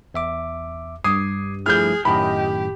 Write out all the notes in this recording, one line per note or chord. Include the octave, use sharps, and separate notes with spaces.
E2 E5 D6
G2 D6 D#6 G#6 C7
F3 A3 E4 G#4 F6 G6
F#2 A2 D#3 G4 D#5 B5